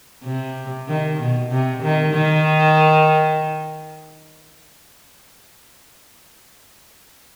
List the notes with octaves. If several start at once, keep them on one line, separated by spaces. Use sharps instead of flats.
C3
D#3
B2
C3
D#3
D#3